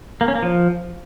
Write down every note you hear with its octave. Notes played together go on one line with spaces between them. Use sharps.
A#3
C#4
A#3
F3